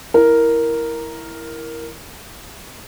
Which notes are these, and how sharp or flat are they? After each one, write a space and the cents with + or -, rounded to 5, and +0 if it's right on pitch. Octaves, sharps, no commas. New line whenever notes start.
E4 +0 A#4 +0